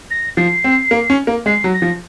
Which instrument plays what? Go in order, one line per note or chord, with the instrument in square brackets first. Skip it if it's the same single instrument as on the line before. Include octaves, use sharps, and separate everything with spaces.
[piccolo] A#6
[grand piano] F3 [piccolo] C7
[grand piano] C4
A#3
C#4
A#3
[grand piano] G#3 [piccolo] C7
[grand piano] F#3
[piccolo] A#6
[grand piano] F3